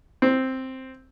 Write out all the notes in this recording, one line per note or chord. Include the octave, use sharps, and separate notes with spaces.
C4